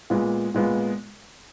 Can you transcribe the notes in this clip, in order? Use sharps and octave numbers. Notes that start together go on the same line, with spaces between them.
A#2 G#3 B3 F4
A#2 G#3 B3 F4